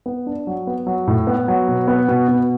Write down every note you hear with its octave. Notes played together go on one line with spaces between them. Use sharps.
B3
D4
F#3
B3
F#3
A2
B3
F#3
B2
B3
B2
B2